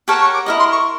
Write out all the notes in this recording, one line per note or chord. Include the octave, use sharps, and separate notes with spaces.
G4 A#4 C#5 F#5 A5
C#6
D6
E4 G4 A#4 D#5
C6
C#6